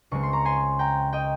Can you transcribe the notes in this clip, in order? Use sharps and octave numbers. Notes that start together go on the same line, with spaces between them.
C#2 C#3 G#3 C4 C#6
C6
A#5 C#6
G#5 C6
G5 A#5
D#5 G5